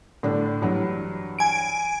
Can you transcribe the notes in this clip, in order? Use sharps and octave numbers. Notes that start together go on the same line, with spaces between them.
A2 D3 D4
G2 E3 F#3
G#5 D7